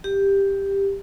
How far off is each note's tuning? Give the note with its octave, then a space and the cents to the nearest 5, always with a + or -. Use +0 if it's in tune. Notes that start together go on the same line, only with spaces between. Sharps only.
G4 +10